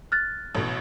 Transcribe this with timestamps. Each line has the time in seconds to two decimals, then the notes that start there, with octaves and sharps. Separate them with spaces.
0.12 F6 F#6 A6
0.55 A1 B2